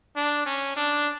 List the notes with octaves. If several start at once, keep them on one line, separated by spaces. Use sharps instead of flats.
D4
C#4
D4